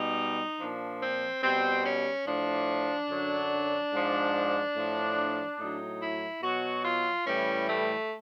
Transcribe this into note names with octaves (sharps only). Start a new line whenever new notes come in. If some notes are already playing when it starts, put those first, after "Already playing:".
Already playing: B2 G3 D#4
A#2 F3 D4
C4
B2 G3 C4
C#4
A2 F3 D4
F#2 D3 F#3
G#2 F3
A2 F3
A2 F#3 D#4
E4
B2 F#3 F#4
F4
A2 E3 G3 C#4
A3